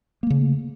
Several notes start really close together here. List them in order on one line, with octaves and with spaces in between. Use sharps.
A#3 A3 C#3